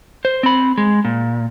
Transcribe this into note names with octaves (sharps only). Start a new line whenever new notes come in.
C5
C4 B5
G#3
A#2